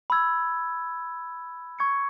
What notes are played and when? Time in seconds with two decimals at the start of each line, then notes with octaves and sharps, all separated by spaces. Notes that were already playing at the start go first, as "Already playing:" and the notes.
0.10 B5 E6 G#6
1.79 C#6 G#6 C#7